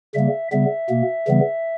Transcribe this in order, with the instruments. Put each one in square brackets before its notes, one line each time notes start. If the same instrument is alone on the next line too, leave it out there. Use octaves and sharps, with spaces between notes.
[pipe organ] C#3 G3 A#3 E5
C#3 G3 B3 E5
B2 A#3
C#3 E3 G3 B3